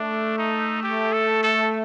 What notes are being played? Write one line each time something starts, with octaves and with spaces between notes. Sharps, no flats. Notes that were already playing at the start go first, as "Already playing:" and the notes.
Already playing: A3 D4
D#4
G4
A4
A4